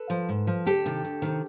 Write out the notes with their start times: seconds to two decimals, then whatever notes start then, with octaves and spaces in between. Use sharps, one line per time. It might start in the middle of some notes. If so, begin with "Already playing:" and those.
Already playing: A4 B4
0.10 F3
0.29 G#2
0.47 F3
0.66 D2 G4 A4
0.86 C3 D#3
1.04 D2
1.22 C3 D#3